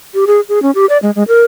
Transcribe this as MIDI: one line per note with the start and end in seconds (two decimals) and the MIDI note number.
0.14 0.25 67
0.27 0.41 68
0.49 0.62 68
0.62 0.71 61
0.75 0.86 67
0.89 0.98 74
1.02 1.11 56
1.16 1.23 56
1.28 1.44 70